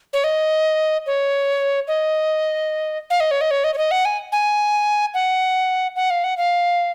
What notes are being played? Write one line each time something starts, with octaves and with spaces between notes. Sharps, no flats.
C#5
D#5
C#5
D#5
F5
D#5
C#5
D#5
C#5
D#5
C#5
D#5
F#5
G#5
G#5
F#5
F#5
F5
F#5
F5